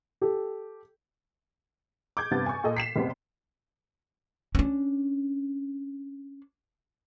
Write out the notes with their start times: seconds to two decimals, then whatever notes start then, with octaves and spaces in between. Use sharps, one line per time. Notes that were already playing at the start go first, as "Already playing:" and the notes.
0.21 G4 A4
2.17 D6 G6 G#6
2.31 G2 C3 B3 A6
2.46 G#5 C#6
2.64 A#2 A4 A#4 D#5
2.76 B6 C7 E7
2.96 F1 C3 B3
4.55 C#4 D4